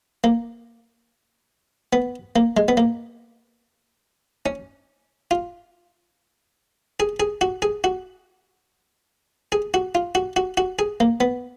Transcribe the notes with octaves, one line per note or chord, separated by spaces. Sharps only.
A#3
B3
A#3
G#3
B3
A#3
C#4
F4
G#4
G#4
F#4
G#4
F#4
G#4
F#4
F4
F#4
F#4
F#4
G#4
A#3
B3